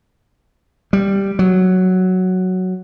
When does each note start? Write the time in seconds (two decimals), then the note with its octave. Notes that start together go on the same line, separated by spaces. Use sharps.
0.93 G3
1.39 F#3